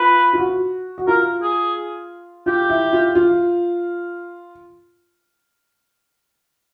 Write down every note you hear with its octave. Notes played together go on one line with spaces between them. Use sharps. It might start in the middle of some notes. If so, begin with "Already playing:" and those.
Already playing: F4 B4
F4
F#4
F#4
F4 A#4
G#4
F4 G4
E4
F4
F4